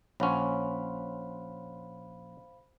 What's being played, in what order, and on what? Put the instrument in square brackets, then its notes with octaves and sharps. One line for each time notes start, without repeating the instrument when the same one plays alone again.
[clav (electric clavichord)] A#1 C#4 [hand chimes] C5 F5 B5 [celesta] C#5 F#5 C6